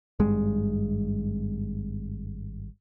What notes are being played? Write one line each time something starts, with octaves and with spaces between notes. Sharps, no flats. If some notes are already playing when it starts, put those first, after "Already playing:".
G#1 G2 G#3